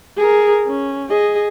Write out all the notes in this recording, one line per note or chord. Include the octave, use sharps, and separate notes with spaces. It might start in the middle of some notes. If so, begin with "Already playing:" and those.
G#4 A#4
C#4
G#4 D#5